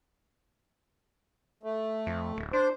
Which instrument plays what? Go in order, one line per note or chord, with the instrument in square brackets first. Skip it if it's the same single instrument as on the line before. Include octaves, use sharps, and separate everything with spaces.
[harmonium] A3
[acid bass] F2
D1
[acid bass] D4 [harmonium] C5